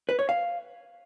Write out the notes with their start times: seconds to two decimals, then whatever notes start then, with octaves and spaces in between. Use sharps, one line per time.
0.09 B4
0.19 C#5
0.29 F5